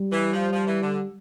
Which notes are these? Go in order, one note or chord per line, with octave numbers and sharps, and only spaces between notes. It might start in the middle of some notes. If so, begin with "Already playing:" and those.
Already playing: G3
E3
F3
F3
E3
D3